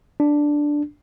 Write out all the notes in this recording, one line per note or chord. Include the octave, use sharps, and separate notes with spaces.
D4